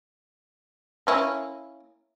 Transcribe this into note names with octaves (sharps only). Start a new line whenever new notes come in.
A#3 C#4 E4